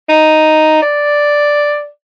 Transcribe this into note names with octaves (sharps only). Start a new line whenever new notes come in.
D#4
D5